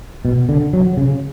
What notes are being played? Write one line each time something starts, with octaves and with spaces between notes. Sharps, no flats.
B2
D3
F#3
C#3